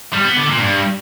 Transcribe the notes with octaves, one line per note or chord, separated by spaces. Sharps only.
G3
B3
D3
A#2
G2